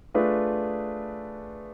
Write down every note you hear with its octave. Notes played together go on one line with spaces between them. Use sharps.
A3 D4 F4 G#4 B4